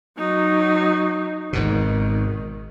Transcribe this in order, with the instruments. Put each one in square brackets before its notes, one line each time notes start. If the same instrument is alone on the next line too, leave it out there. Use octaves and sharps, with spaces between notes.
[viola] F#3 D#4
[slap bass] G#1 G#2 B2 [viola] D#3